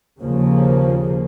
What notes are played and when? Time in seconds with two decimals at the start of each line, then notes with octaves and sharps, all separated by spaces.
0.20 D#2 C#3 F3 A#3